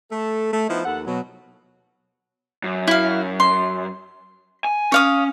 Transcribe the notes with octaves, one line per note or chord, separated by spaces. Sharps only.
A3 A4
A3
F3 B3 D#4 E4
D#2 A4 F#5
B2 F#3
F#2
E4 F5
C6
G#5
C#4 C#5 F5 D#6